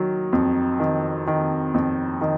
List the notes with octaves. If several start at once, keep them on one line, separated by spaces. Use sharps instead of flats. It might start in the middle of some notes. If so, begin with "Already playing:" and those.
Already playing: D#3 F#3
F2
D#3
D#3
F2
D#3